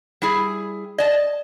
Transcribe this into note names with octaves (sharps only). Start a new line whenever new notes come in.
G3 E4 G#4
D5 D#5 A5